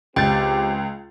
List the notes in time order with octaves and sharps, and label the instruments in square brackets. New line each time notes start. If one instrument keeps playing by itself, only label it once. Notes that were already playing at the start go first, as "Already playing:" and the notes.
[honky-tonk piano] C#2 G6 A6 [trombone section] C4 G4 [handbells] G5